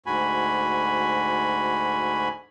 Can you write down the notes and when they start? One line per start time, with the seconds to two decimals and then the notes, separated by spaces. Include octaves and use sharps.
0.06 D2 G#2 F#4 G#5 B5